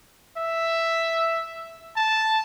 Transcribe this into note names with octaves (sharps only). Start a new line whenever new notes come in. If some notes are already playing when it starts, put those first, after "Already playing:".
E5
A5